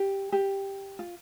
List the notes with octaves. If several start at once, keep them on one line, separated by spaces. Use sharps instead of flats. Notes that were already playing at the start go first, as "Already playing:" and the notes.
Already playing: G4
G4
F4